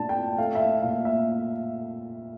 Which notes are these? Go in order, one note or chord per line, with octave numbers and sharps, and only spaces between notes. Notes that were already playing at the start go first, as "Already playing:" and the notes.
Already playing: A#2 A3 D4 A5
G5
A3 F5
E5
F5
A#2 F5
E5